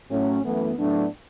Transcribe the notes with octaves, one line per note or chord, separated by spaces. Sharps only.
A2 F#3 A3 C#4
F#2 E3 A3 B3
A2 F#3 A3 B3 D4